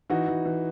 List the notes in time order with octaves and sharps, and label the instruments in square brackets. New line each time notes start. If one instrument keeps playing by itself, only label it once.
[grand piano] E3 D#4 F#4
E3
E3